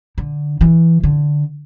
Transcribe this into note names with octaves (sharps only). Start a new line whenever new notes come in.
D3
E3
D3